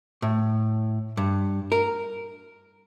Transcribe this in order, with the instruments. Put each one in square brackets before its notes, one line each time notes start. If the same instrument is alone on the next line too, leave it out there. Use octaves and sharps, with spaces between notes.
[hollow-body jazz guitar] A2
G2
A#4